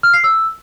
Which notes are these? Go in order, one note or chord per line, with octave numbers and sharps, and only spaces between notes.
F6
C7
E6